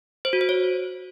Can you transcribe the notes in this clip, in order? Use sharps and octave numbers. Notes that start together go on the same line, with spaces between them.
C5
F#4
C5
C#5